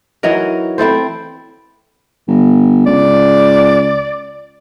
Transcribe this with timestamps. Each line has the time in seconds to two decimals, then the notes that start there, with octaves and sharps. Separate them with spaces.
0.23 E3 F#3 D#4 A#4
0.78 C4 E4 A4 C5
2.28 G1
2.86 C#2 D5